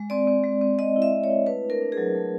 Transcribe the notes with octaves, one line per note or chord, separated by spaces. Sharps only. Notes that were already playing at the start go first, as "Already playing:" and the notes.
Already playing: G#3
C4 D5
C4
G#3
C4
G#3 D#5
E4
E5
C4
C#5
E4
A3 B4
D4
A#4
D4
G#4
F#3
A3